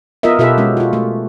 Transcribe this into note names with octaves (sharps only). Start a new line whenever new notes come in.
B3 F4 A#4 D#5 E5
B2 F4 G4 A4 B4 E5
G#3 C#4 F#4
F4 F#4
A3